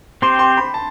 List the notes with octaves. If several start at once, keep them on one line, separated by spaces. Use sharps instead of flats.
C4 G4 C5 C6
C6
B5
A5